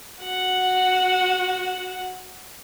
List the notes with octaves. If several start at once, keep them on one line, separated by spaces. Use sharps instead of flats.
F#4 F#5